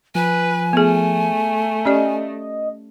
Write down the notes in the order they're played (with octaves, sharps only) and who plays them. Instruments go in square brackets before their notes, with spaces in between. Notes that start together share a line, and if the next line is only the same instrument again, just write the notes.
[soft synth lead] F3 [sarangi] B4 [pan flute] G#5
[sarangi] A3 [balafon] B3 G#4
[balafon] C#4 G4 D5 [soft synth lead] D#5